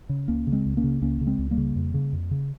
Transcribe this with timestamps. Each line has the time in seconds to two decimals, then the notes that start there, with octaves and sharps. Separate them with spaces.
0.09 C#3
0.28 C#2 A#3 C#4
0.47 C#3
0.52 G#3 C4
0.66 C#2
0.77 A#3 C#4
0.84 C#3
1.02 C#2 A#3 C#4
1.21 C#3
1.27 G#3 C4
1.39 C#2
1.51 G3 A#3
1.58 C#3
1.76 F2
1.94 C#3
2.13 F2
2.31 C#3